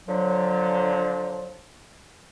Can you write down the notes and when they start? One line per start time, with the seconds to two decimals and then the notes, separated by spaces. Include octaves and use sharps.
0.08 D3 F3 F#3